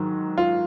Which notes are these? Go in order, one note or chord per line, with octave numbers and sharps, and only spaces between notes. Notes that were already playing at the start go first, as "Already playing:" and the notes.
Already playing: G#2 D#3 F#3
F4